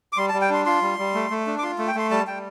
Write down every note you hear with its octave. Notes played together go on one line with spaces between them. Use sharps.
D6
G3 C6
A5
G3
G5
D4 C6
F4 C6
G3
G3
A3
A3
D4
D6
F4 C6
A3
G5
A3 C6
G3 A5
G3 G5